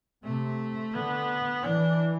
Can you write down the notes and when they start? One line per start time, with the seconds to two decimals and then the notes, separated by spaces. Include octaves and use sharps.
0.24 C3 A3
0.94 D3 B3
1.64 E3 D4